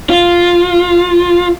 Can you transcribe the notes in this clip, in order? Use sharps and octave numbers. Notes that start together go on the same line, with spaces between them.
F4